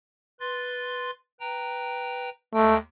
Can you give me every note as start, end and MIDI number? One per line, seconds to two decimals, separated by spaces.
0.40 1.11 71
0.40 1.11 84
0.40 1.11 93
1.40 2.30 71
1.40 2.30 79
1.40 2.30 82
2.54 2.77 39
2.54 2.77 56
2.54 2.76 57
2.54 2.77 79